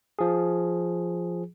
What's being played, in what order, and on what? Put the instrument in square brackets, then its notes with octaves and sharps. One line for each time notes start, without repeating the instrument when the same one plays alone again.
[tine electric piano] F3 G#4